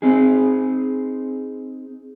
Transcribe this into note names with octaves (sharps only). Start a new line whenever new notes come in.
C4 D#4 G#4